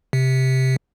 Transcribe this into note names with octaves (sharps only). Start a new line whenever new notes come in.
C3